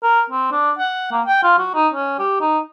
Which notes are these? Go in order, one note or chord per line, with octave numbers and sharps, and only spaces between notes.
A#4
C4
D4
F#5
A#3
G5
F4
F#4
D#4
C#4
G4
D#4